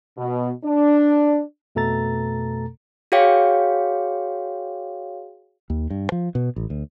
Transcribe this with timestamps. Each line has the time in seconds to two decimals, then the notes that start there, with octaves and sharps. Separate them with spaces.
0.17 B2
0.64 D4
1.75 F2 B2 A3 A4 A#5 A6
3.12 F#4 G#4 C#5 F5 G5
5.70 D#2
5.90 G2
6.12 F3
6.35 B2
6.56 A1
6.70 D2